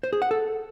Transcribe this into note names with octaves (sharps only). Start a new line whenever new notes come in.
C5
G#4
F#5
A4